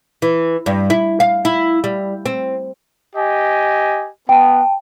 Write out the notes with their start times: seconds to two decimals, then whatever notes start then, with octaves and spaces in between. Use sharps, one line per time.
0.22 E3
0.66 G2
0.90 E4
1.20 F5
1.45 E4
1.84 G3
2.26 C4
3.16 G4 D#5 G#5
4.29 B3 G5 A5